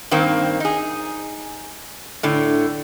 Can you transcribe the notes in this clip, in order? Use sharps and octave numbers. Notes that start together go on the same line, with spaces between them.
G2 D#3 A#3 C4
D#4 G#4
A2 D3